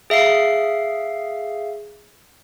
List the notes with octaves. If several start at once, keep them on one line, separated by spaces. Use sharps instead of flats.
G#4 E5 F5 C7